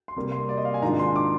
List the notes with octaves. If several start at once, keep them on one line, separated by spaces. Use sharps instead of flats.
C6
C3 G3 A#3
C6
D5
D#5
F5
G#5
G#2 D#3 G#3 D4 F4 A#5
C6
D6